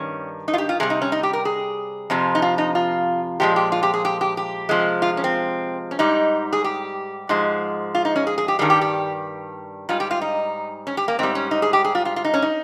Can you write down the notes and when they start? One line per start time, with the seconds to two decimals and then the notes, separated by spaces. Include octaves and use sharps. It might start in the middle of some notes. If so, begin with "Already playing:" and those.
Already playing: G2 D#3 G3 C#4
0.48 D#4
0.54 F4
0.58 G4
0.69 F4
0.80 C3 G3 G#4
0.90 D#4
1.02 C#4
1.12 D#4
1.23 G4
1.33 A#4
1.45 G#4
2.10 F2 C3 F3
2.35 D#4
2.42 F4
2.58 D#4
2.75 F4
3.40 A#2 F3 G#3 G4
3.56 G4
3.72 F4
3.83 G4
3.94 G#4
4.05 G4
4.21 G4
4.37 G4
4.69 C3 F3 G#3
5.02 F4
5.17 C#4
5.24 C4
5.91 C#4
5.99 G#2 G3 D#4
6.53 G#4
6.64 G4
7.29 G#2 F3 G#3
7.95 F4
8.05 D#4
8.16 C#4
8.27 G#4
8.38 G#4
8.48 G4
8.59 G2 D#3 G3 G#4
8.70 G4
8.81 G4
9.89 G#2 G3 F4
10.00 G4
10.11 F4
10.22 D#4
10.87 C#4
10.97 G4
11.08 A#3
11.19 G#2 G3 C4
11.35 C#4
11.51 D#4
11.62 G#4
11.73 G4
11.85 G#4
11.95 F4
12.05 F4
12.16 F4
12.24 D#4
12.34 C#4
12.42 D#4